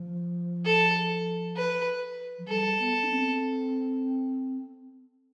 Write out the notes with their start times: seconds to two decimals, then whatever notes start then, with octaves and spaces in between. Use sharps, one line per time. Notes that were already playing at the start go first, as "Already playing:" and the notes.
Already playing: F3
0.66 A4
1.57 B4
2.39 F3
2.48 G3 A4
2.79 B3
3.03 D4
3.09 C4